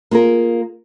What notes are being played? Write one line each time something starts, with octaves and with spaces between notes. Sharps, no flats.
A#3 F4 G#4 A#4